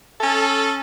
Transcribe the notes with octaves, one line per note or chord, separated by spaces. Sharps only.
C#4 A4